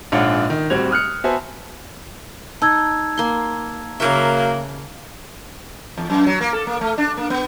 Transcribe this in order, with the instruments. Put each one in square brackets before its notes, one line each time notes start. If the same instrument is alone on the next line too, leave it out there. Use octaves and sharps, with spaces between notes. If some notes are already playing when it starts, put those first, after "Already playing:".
[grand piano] A#1 G#2 D4 F4 C#5 F#5
D#3
D1 G3 C4 F#4 G#6 F7
D#6 F6 F#6 C#7
B3 F#4 C5 E5 G#5 A5
[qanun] D#4 [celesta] A5 E6 G#6
[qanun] A#3 C6
[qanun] C#3 A#4 E5 [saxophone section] F#3 A#3
[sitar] E2
F#2
F#3
A#3
A4
A#3
A3
D4
A#3
B3